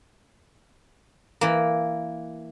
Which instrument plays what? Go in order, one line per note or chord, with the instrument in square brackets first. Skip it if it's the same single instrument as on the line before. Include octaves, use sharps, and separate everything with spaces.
[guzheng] E3 A#3